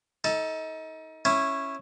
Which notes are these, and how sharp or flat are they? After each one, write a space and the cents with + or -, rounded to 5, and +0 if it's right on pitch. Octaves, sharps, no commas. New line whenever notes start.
D#4 +30 A4 +0
C#4 -10 E4 +0